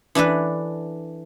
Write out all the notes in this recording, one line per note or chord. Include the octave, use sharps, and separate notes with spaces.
E3 D4 A4 B4